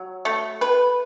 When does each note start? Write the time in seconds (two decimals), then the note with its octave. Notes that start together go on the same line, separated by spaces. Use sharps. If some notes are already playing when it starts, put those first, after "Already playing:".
Already playing: F#3
0.25 A3
0.61 B4